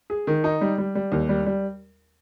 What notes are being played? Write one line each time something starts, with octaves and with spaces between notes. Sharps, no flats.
G#4
D#3
D#4
G3
G3
G3
D#2
G3
G3